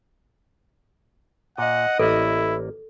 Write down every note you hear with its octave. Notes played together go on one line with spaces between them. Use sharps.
A#2 D#5 F#5
A1 A#3 E4 A4 D5